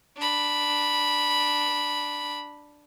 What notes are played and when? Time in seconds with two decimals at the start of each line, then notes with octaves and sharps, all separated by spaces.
0.17 D4 B5